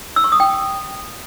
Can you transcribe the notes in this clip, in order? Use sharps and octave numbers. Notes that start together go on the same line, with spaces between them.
E6
C#6
D#6
G5